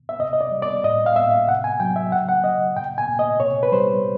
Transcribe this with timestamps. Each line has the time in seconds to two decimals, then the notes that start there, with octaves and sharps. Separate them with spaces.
0.09 E5
0.19 C3 D#5
0.33 D#5
0.41 D5
0.51 G3
0.62 D5
0.84 A2 D#5
1.06 F5
1.16 A2 E5
1.48 C3 F#5
1.64 G#5
1.80 F#3 G5
1.96 E5
2.12 C#3 F#5
2.29 F#5
2.44 C#3 D#5
2.76 A#2 G5
2.98 G#5
3.09 A#2
3.19 D#5
3.40 C3 C#5
3.63 B4
3.72 G3 C5